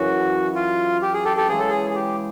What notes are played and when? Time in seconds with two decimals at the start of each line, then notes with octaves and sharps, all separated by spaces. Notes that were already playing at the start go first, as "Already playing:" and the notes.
Already playing: F#2 C#3 E3 F#4
0.55 F4
1.02 G4
1.14 G#4
1.25 G4 A4
1.36 G4 A4
1.48 C#3 E3 G#3 G#4
1.59 A4
1.70 G#4
1.90 G#4
1.95 G4